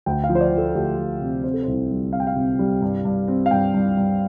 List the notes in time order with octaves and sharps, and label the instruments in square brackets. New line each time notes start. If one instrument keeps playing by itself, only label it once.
[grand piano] D2 G5
F5
F3
C5
D5
F3
A4
D2 G4
D2
C3
C4 C5
A4
C2 C5
G3
C4 F5
G5
F5
C3
G3
G2
G2
C4
F5
G2 G5
G2
G2